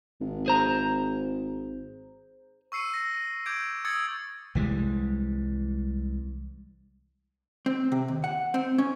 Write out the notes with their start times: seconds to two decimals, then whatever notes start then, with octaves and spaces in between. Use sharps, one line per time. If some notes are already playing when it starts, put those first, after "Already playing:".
0.21 G#1
0.46 G#4 C5 A#5
2.72 C#6 E6 C7 C#7 D#7
2.94 A#6
3.46 D6 G6 G#6 D7
3.85 D#6 E6 G#6 A6 C#7
4.55 C2 E3 G3 G#3
7.66 C4
7.92 C3
8.08 D#2
8.24 F#5
8.54 C4
8.78 C#4